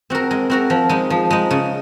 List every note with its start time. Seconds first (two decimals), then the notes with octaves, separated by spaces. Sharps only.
0.10 C4 F#4 A#4
0.31 G#3
0.50 C4 F#4 A#4
0.70 F3
0.89 G#3 D#4
1.10 F3
1.30 G#3 D#4
1.51 C#3